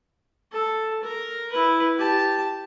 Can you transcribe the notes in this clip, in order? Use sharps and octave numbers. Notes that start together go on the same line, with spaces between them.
A4
A#4
E4 B4
G4 A5